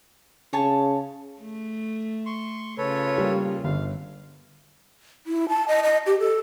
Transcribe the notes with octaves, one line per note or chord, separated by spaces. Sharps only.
C#3 C#5 G#5 A5
A3
C6 C#6
C#3 F4 A4 B4 C#5
G3 A#3
G1 F5
E4
A5
D#5
D#5
G4
A4